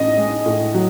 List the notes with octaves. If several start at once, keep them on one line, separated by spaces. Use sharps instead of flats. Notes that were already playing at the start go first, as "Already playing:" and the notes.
Already playing: A1 D#5
G#3
A2
F#3